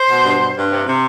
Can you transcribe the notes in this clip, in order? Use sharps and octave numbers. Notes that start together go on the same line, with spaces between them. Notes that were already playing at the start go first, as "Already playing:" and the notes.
Already playing: C5
B2
G2
G2
G2
C3
C3